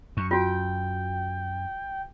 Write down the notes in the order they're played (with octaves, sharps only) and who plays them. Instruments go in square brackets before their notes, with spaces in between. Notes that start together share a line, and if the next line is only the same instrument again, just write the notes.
[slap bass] F#2 [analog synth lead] C#6
[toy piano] F4 F#4 [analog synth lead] G5